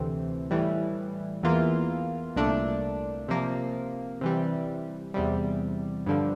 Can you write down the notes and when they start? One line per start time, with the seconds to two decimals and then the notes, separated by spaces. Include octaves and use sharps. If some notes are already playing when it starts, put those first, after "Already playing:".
Already playing: D2 C3 E3 A3 C4
0.50 A2 E3 G3
1.43 E2 E3 A#3 F4
2.36 C2 A#2 A3 D4
3.28 C3 F3 A#3
4.21 C3 E3 G3
5.14 E2 C3 G3
6.06 G2 D3 F3